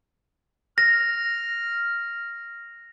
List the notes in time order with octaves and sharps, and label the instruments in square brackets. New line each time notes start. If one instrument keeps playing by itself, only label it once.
[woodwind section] F6 [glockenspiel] A#6